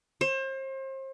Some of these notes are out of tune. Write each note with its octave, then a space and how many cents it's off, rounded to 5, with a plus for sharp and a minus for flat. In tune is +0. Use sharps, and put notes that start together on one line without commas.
C5 +35